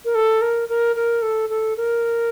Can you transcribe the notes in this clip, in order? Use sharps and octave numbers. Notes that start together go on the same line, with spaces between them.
A#4
A4
A#4
A#4
A#4
A4
A4
A#4